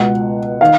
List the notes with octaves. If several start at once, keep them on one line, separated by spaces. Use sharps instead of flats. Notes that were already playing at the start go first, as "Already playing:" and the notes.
Already playing: C#2 B2 F#5
D#3 F5